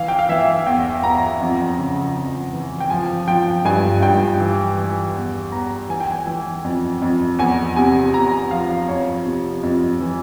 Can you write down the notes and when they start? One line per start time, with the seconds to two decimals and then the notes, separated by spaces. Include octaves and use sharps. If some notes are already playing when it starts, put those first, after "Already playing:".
Already playing: E3 F5
0.08 G5
0.19 F5
0.29 E3 E5
0.67 E2 G5
1.03 E2 A#5
1.41 F2
1.78 C#3
2.16 F2
2.53 E3
2.80 G5
2.90 F3 G#5
3.28 F3 G5
3.65 G2 G#5
4.02 G2 G5
4.40 E3
4.78 E3
5.15 E2
5.52 E2 A#5
5.89 E3 G#5
6.00 G5
6.11 G#5
6.27 E3
6.64 F2
7.02 F2
7.38 E2 G#5
7.76 C3 G#5
8.14 E2 A#5
8.51 F3 F5
8.88 F2 C#5
9.26 C3
9.63 F2
10.00 E3